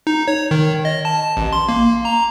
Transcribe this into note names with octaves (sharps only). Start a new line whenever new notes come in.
D#4
C#5
D#3
D#5
A5
A1
C6
A#3
A#5